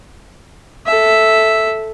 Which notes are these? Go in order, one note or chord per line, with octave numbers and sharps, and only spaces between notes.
A4 E5